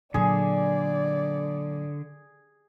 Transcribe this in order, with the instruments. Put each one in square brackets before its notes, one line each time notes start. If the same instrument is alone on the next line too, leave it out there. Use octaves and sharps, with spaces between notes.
[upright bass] A#2 F#3 [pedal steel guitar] D3 [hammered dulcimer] G#4 [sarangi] D5